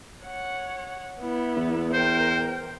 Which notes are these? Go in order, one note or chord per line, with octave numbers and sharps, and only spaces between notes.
C#5 F#5
B3 E4
E2
A#4 C5 G5